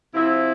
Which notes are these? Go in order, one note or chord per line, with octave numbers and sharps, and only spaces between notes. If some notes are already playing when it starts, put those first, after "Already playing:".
C3 F3 C4 E4